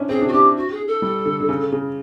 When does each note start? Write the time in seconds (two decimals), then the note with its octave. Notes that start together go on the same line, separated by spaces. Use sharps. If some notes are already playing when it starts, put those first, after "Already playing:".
Already playing: C#4 D4 E4
0.09 C4 G#4
0.21 D4
0.27 F#4
0.32 D4 G4
0.56 F#4
0.71 G#4
0.87 A4
1.02 G3
1.26 D3
1.40 D3
1.49 C#3
1.72 C#3